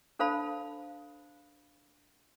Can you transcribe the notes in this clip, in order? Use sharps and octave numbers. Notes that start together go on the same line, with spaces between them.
D4 A4 C5 F5 A5 B5